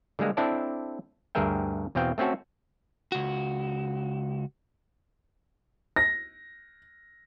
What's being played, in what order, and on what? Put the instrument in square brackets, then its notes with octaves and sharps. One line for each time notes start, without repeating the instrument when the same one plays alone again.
[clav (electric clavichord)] D3 G3 G#3 A#3
C4 D4 E4 A4 D5 A5
D2 G2 G#4 A#4 E5 G5
E2 B2 C4 F5 G5
A3 C4 C#4 F#4 A4
[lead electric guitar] C#2 F#4
[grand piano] A#6